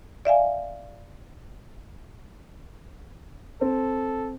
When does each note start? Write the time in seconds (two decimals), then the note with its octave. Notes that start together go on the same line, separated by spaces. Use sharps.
0.25 D5 E5 F5 G#5
3.61 C4 A4